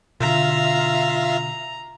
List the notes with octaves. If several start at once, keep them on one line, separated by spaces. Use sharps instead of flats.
B2 D3 F4 E5 F5 A#5